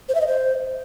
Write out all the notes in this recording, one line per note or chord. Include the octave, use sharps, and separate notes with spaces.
C5
E5
D#5
C5